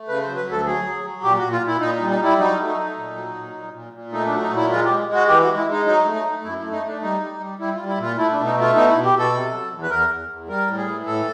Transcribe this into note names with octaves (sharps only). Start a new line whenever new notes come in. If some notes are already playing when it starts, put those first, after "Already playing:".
Already playing: A3
C#3 B4
F#3 C5
B4
D2
A4
F#3 G#4
F#3
F#3
A#2 G4
A#2 F#4
F4
A#2
E4
A#2 D#4
G3 D#4
D#4
G3 E4
F#3 D#4
A3
D#4
A3
A#2
F#3
A#2
A#2
A#2
A#2
A3 D#4
D4
F#3
D#4
A#2 E4
G#3 F4
G#3 G4
G#3 F#4
E3 G4
F#4
G#3
E4
G#3 D#4
F#3 D#4
A3
D#4
A3
F#2 E4
A3 E4
D#4
A3 D4
G3 D#4
G3
G3
G3 E4
G3 F4
E4
A#2 F4
A3 E4
B2 D4
D#4
A3
F4
B2 D#4
B2 E4
G4
B2 A4
C3
F#3
E2
B4
E2 A#4
E2
E2
G3 A#4
A2
G#4
E3
A2 A4